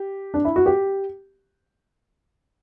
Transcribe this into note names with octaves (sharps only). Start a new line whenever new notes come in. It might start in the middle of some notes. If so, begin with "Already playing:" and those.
Already playing: G4
D4
E4
F#4
G4